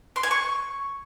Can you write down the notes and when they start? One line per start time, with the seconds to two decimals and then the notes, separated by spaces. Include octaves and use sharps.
0.16 C6
0.23 G#5
0.31 C#6